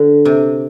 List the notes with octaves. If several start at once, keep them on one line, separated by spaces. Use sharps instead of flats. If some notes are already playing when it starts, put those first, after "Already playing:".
Already playing: D3
C3